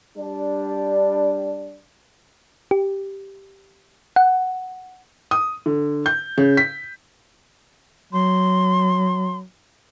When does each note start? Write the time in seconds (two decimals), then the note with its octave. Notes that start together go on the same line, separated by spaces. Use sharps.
0.17 G3 D4
2.71 G4
4.16 F#5
5.31 D#6
5.66 D3
6.06 G6
6.38 C#3
6.57 B6
8.13 F#3 C6